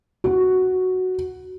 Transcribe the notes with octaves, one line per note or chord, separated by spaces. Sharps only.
F#4